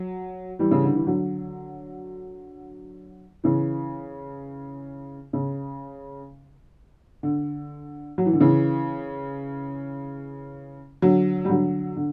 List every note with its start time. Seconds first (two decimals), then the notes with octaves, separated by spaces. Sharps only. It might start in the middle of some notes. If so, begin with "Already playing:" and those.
Already playing: F#3
0.59 E3 G3
0.71 C#3
0.84 D3
0.95 E3
1.07 D3 F#3
3.44 C#3 E3
5.33 C#3
7.23 D3
8.18 F#3
8.26 E3
8.33 D3
8.40 C#3 E3
11.02 D3 F#3
11.45 G3
11.50 D3 F#3
11.97 D3